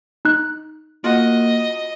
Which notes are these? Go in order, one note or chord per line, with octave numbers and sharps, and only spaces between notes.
D#4 F#6
A#3 F4 F#4 D#5